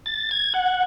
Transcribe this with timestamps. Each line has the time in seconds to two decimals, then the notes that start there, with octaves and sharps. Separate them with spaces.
0.06 A6
0.31 G#6
0.54 F#5